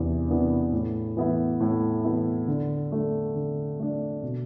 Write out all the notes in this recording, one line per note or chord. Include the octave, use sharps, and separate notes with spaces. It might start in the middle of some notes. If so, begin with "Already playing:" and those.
Already playing: E2 C3 E3 B3 D4
C3 E3 B3 D4
A2
E3 B3 E4
A2
E3 B3 E4
D3
A3 D4
D3
A3 D4
B2